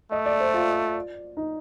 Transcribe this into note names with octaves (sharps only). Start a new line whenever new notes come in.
A3 D#5
D5
C5
F4
D#4